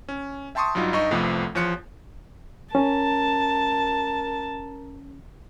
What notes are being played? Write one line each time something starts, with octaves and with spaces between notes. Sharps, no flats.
C#4
E5 G5 A5 C6 C#6 D#6
G2 F#3 G3 D#4 F4
G2 D#4 D#5 C#6
C2 F2 C3 F3 A3 B3
E2 F3 C#5 F#6 C#7
C#4 A#4 A5